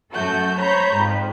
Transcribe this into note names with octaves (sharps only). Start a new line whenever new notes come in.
F#2 A3 F#4 A4 G6
C5 C#5 A#5 B5 G6
F2 G#2